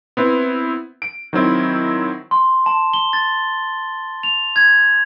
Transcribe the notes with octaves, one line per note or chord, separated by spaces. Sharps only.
B3 C4 E4
D7
D#3 F#3 C4 E4
C6
A5
G7
A6
F7
G#6